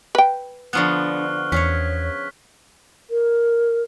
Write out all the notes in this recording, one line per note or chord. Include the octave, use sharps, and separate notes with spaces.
B4 G5
D3 F3 B3 C#6 F6 F#6
E2 C#4 G#4 C#5 B6
A#4